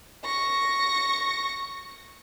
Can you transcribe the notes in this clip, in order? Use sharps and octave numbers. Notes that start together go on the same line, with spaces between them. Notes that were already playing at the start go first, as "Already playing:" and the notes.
C#6 A#6